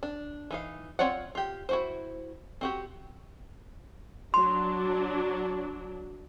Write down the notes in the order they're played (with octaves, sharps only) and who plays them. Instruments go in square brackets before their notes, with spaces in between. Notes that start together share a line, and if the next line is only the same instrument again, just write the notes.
[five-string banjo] D4
E3 D#4 F5
C4 F4 C#5 D5 F#5
F4 G4
E4 F#4 C5
C4 F#4 G4
[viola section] F#3 D4 [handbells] C6